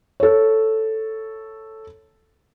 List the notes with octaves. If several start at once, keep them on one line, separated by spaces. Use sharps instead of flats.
A4 C#5